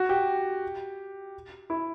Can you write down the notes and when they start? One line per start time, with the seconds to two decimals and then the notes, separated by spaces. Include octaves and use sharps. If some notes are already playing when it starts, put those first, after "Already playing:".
Already playing: F#4
0.09 G4
1.70 E4